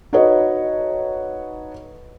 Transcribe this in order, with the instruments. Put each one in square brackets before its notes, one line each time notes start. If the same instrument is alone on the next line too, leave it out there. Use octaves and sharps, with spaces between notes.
[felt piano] D#4 F#4 A4 B4 C#5 D#5